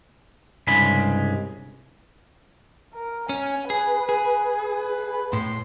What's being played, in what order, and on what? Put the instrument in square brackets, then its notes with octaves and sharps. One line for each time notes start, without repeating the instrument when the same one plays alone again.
[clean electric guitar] C2 G2 C#3 G#3 B5
[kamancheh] A#4
[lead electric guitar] C#4 [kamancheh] G#5
[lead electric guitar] G#4 [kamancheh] B4
[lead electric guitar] G#4
[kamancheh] B4
[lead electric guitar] A2 [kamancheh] C6